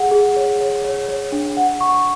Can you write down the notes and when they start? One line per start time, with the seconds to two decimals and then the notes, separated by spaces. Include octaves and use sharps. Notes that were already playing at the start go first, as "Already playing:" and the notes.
Already playing: G#4 F#5
0.11 G#4
0.36 C#5
0.61 C#5
0.84 C#5
1.08 C#5
1.32 D4
1.57 F#5
1.81 C#6